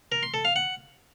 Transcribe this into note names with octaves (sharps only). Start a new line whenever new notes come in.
A#4
C6
A4
F5
F#5